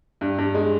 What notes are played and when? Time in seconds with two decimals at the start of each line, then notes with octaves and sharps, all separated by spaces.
0.21 G2
0.38 G2
0.55 G#3